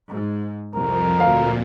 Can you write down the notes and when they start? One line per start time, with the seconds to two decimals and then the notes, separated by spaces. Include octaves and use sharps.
0.11 G#2
0.74 C2 F2 A#4
1.20 D2 A#2 F5